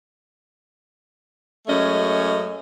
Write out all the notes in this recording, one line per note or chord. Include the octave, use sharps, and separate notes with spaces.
F#2 G#3 A3 C#4 D#5